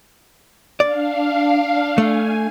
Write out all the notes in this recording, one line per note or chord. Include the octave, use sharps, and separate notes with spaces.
D4 D5 F5
A3 G#5